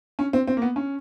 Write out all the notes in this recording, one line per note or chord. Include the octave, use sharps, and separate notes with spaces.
C#4
C4
C4
A#3
B3
C#4